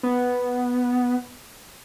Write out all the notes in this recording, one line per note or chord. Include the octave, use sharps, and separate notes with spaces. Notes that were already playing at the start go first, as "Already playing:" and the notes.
B3